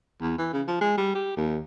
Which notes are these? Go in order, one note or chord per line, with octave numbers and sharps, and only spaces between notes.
E2
E3
C#3
F3
G#3
G3
G4
D#2